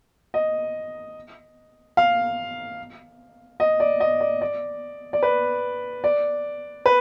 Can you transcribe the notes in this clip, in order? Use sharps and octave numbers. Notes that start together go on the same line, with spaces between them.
D#5
F5
D#5
D5
D#5
D5
D5
D5
B4
D5
B4